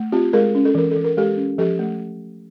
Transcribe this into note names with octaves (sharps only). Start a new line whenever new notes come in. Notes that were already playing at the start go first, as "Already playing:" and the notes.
Already playing: A3
C4 F4 G4
G#3 G#4 A#4
C#4
A4
E3 A#4
E3 A4
A#4
G#3 G4 A4
C#4
F3 G4 A4
A3